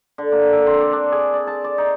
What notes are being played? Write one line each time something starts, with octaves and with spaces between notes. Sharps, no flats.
D3
A#3
A4
C4
D5
D4
G#4
D5
A5
D5
D#4